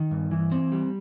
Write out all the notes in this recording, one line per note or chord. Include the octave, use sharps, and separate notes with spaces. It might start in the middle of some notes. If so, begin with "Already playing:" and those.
Already playing: D#3
G2
E3
C4
G3